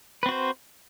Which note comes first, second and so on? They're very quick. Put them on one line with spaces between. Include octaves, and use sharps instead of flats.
B4 C4 F#4 C5